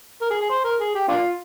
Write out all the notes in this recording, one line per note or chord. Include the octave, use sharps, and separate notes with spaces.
A#4
G#4
G#4
C5
A#4
G#4
G4
A#3 D4 F4